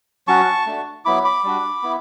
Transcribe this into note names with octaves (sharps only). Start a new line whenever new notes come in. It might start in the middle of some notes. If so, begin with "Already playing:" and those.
F#3 C#4 F#4 A5 C#6
A3 D4 F#4
F#3 B3 E4 B5 D6
B5 D6
G3 D4 F#4
B3 E4